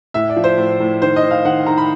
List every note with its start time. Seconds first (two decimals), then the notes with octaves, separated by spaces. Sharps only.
0.14 A2 E5
0.29 D5
0.36 F3
0.44 C5
0.58 A2
0.80 A2
1.02 D#3 C5
1.16 D#5
1.23 D#3
1.31 F5
1.45 D#3 F#5
1.67 D#3 A#5
1.78 B5